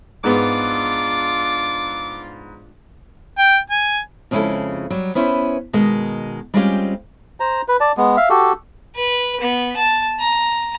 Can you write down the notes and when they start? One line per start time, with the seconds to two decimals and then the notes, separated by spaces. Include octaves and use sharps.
0.24 G#2 B3 D4 F4 D6
3.38 G5
3.70 G#5
4.31 F2 C#3 G#3 B3 E4 A4
4.90 F#3 G3
5.15 B3 C#4 E4 B4 C5
5.73 B2 D#3 G#3
6.54 G3 G#3 C4 C#4 F4 G4
7.40 C5 A#5
7.68 B4
7.80 D5 A5
7.97 G#3 B3
8.17 E5 F5
8.30 F#4 G4 A4
8.96 B4
9.41 B3
9.77 A5
10.19 A#5